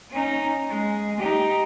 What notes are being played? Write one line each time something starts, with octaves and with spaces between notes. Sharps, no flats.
C#4 D#4
G#3
D#4 G4